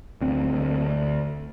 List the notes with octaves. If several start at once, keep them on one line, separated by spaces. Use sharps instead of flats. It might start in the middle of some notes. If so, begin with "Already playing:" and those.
D2 C4
D2